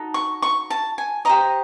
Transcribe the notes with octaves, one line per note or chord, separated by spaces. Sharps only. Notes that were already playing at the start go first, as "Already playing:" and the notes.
Already playing: D#4 F#4 A4
C#6
C#6
A5
G#5
G4 C5 D#5 A#5